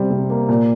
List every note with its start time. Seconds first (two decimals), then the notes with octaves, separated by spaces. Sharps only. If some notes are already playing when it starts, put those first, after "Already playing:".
Already playing: C3 G3 C4
0.10 C3
0.30 A#3
0.49 A#2